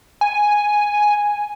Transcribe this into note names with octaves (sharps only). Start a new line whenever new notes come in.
G#5